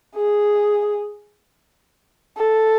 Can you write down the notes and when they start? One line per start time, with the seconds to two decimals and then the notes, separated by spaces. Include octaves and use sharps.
0.16 G#4
2.38 A4